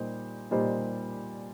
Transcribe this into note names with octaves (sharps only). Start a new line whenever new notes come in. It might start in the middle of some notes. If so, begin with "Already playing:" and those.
Already playing: A#2 G3 D#4 C5
A#2 G3 D#4 C5